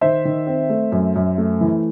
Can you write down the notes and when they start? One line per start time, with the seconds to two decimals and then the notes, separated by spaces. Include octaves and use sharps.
0.01 D#3 C5 E5
0.25 D#3
0.47 C4
0.70 A3
0.92 F#2
1.16 F#2
1.38 A3
1.61 E3